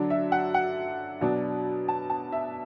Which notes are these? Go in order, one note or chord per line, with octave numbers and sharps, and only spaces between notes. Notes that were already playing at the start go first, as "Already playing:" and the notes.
Already playing: D3 F#3 D4
E5
F#5
F#5
B2 F#3 B3 D4
A5
A5
E5